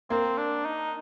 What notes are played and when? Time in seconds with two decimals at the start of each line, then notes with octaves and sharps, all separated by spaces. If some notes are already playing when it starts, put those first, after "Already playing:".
0.10 A#3 C4
0.37 D4
0.65 D#4